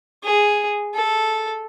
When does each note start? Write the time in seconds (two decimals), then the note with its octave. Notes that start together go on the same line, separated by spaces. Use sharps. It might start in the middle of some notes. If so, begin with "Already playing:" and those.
0.24 G#4
0.94 A4